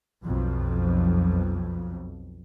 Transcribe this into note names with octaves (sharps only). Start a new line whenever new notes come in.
B1 F2